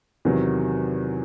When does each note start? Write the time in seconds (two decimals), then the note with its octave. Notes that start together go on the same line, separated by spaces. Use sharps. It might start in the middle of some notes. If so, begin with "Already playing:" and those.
0.25 E2 C3 D#3 F#3